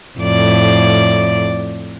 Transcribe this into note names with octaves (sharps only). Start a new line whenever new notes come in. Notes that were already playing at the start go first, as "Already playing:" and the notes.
F2 A2 D5